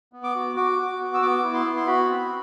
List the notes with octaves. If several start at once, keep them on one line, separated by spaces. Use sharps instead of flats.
B3
D6
F#4
F#4 D6
F#4
B3
E6
B3 D6
E4
C6
B3
C6
F#4 B5
C4